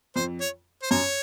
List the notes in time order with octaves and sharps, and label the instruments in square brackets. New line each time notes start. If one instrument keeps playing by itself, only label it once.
[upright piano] F2 [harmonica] C5
[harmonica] C#5
C5
[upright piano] F#2 [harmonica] C#5